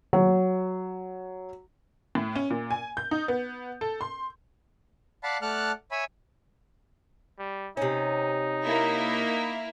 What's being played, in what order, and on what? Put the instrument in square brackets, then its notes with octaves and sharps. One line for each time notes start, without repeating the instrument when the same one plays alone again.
[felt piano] F#3
[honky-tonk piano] A2
C#4
A#2
G#5
G6
D#4
B3
A4
C6
[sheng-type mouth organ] D5 F5 F#5 A5 B5
A3 D5 F#5 A5 F6 F#6
C#5 E5 G#5 B5
[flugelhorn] G3
[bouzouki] C3 C#4 [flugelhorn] D#4
[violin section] A#3 E4